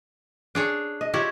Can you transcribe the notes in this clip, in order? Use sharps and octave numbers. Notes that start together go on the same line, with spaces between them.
D4 G#4 C#5
D#5
E4 F4 G4 C#5